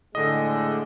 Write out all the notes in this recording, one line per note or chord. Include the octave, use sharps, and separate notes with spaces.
A2 D3 G#3 D#5